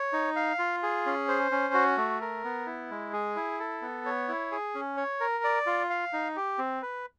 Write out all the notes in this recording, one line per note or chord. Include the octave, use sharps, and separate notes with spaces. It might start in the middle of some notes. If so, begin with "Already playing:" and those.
Already playing: C#5
D#4
F5
F4
G#4
C#4
C5
C#4
F#4
A3
A#4
B3
E4
G#3
G#4
E4
A4
B3
C#5
E4
G#4
C#4
C#5
A#4
D5
F4
F5
D#4
G4
C4
B4